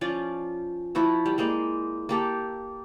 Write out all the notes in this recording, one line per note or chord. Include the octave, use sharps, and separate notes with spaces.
F3 C#4 F4 D5
F3 E4 F#4 E5
G3
G#3 A#3 C5 D5
A#3 G4 A4